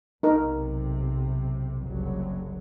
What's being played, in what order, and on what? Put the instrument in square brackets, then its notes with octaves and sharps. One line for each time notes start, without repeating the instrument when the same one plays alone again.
[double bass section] B1 C3 [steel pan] D#4 A#4
[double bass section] F#1 C2 F#3